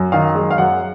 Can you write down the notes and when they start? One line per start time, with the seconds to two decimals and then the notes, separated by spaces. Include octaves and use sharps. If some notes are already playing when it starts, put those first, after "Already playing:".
Already playing: F#2
0.12 D#3 F5
0.35 G#3
0.51 F5
0.58 F#2 F#5